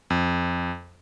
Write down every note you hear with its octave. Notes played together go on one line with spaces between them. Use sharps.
F2